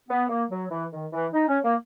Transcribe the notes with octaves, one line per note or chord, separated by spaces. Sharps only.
B3
A#3
F#3
E3
D#3
E3
D#4
C#4
A#3